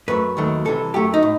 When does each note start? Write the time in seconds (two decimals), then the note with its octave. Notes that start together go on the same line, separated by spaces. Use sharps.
0.08 F#2 F#3 A3 B4
0.37 D#2 D#3 F#3 A3
0.65 C2 C3 E3 A4
0.94 F#2 F#3 A3 G4
1.14 D#4
1.23 A2